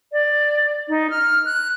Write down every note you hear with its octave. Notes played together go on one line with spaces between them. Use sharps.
D5
D#4
F6
F#6